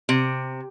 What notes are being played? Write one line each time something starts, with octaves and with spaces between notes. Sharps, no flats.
C3